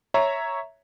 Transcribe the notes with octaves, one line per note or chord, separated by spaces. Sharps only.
C#5 E5 A#5